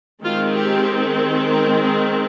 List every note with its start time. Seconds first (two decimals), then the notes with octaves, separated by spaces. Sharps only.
0.24 D#3 G#3 C4 F4
0.56 G4
1.51 A#4
1.83 G#4